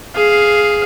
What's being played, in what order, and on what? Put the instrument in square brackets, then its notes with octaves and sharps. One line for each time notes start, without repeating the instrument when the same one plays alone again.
[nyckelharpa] G#4 F5